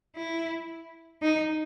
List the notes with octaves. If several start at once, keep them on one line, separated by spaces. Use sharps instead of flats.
E4
D#4